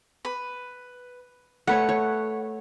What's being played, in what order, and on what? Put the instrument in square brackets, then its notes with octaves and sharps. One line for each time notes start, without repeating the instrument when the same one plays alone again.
[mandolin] B4
[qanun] A3 B4 C#5 [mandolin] F#5
[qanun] C#5